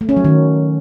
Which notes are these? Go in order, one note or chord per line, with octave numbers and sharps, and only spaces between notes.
A3
C#4
F#3
D#3